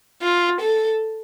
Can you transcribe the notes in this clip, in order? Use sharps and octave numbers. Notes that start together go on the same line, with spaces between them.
F4
A4